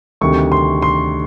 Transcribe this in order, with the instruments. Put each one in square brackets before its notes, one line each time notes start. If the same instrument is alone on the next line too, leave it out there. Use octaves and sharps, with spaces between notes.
[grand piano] D2 C3 D#3 G3 C#6
C6
C6